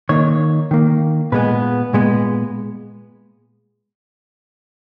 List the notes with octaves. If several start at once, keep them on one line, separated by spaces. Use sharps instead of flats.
D#3 A#3 C#5
D#3 A#3
A#2 G#3 B3 B4
A#2 G#3 B3